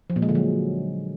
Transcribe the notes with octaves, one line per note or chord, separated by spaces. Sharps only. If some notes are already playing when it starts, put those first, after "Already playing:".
F3
A#2
G#3
D3
F#3